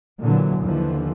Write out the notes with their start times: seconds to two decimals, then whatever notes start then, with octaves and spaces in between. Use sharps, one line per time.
0.21 A#2 D3 E3 F#3
0.62 D#2 D3 E3 F3